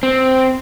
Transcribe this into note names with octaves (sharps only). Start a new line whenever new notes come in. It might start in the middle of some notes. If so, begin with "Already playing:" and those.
C4